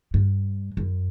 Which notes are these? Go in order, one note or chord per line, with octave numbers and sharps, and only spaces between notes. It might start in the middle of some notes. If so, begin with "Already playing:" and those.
G2
F#2